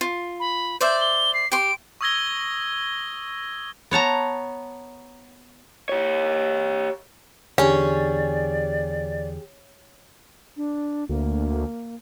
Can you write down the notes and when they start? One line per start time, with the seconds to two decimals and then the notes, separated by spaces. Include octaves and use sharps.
0.01 F4
0.40 B5
0.81 C5 D5 E5 G6
1.01 G7
1.34 C7
1.52 G4 C6 D7
2.01 C#6 D#6 E6 G#6 A#6 G7
3.91 B3 C#5 A5 A#5
5.89 G4 C#5
7.58 E2 D3 C#4 G4 G#4 D5
10.57 D4
11.09 D2 A#3